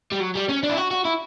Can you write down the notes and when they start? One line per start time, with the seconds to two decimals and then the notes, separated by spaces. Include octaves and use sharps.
0.12 G3
0.20 F#3
0.35 G3
0.49 C#4
0.63 D4
0.69 E4
0.77 F#4
0.91 F#4
1.05 E4